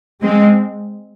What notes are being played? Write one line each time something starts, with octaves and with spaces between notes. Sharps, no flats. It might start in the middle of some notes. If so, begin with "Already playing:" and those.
G#3 C4